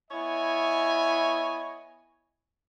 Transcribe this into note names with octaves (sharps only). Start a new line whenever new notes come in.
B3 E4 C#5 D#5 G#5